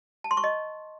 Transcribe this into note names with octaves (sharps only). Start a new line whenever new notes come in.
A5
C6
C#6
D#5